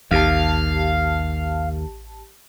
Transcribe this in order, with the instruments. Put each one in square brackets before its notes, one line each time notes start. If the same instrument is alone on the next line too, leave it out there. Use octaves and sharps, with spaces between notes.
[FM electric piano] A1 G4 A5 [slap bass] D#2 [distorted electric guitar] F5